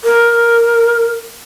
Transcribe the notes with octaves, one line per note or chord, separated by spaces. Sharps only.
A#4